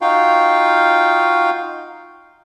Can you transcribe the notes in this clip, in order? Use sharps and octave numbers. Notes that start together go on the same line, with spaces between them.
D#4 F4 F#4 F5 G5